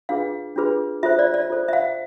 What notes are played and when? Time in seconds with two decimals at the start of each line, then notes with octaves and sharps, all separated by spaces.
0.09 D4 F4 G#4 B4 F5
0.56 D4 F4 G#4 B4
1.03 F4 A4 C5 E5
1.19 D5
1.34 D5
1.50 F4 A4 C5
1.68 E5
1.73 F5